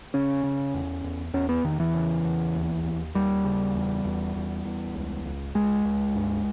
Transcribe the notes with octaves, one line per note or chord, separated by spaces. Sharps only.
C#3 C#4
C#3
E2
E2
E2 C#4
B3
E2 D#3
E3
C#3
E2
D#2
D#2
D#2 G3
C#3
E2
E2
E2
E2
C#2
C#2
C#2 G#3
C#2
G2